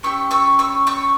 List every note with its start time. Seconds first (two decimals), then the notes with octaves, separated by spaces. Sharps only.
0.03 C#4 E4 G4 C#6 E6
0.31 C#6 E6
0.59 C#6 E6
0.87 C#6 E6